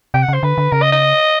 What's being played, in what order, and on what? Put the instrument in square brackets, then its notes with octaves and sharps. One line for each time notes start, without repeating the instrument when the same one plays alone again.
[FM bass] C3 [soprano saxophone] G5
[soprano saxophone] F#5
[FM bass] C#3
[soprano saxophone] C5
[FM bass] D3 [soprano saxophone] B4
[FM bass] D3
[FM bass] C#3 [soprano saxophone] A#4
[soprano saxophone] D#5
D#5